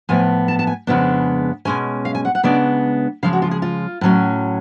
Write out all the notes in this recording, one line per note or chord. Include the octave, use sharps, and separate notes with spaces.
A2 F3 B3 G#5
A5
A5
G#5
F2 C#3 G#3 B3 D4
B2 G#3 C#4 G#5
F5
G#5
F#5
F#5
C#3 G#3 B3 D4 D5
C#3 F3 G#3 F5
F#4
F4
G#4
F4
A2 F#3 C#4